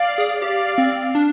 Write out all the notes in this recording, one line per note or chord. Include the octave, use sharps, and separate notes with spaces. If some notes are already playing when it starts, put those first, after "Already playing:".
Already playing: D5 F5
G#4
G4 D5 F5
C4
D4